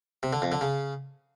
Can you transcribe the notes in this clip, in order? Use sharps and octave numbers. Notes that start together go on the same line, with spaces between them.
C3
D3
F2
D3
C#3